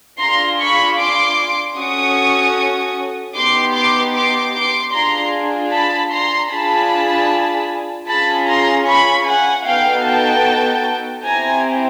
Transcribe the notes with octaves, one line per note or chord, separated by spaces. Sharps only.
D4 F4 G#4 A#5 C6
B5 C#6
C6 D6
C#4 F#4 A4 C#6 D#6
B3 D#4 G4 C6 D6
C6 D6
C6 D6
C6 D6
D4 F4 G#4 A#5 C6
A5 B5
A#5 C6
D4 F4 G#4 A5 B5
C#4 F4 G#4 A5 B5
A#5 C6
B5 C#6
F#5 G#5
B3 D#4 F#4 A4 F5 G5
G5 A5
C4 E4 G4 G#5 A#5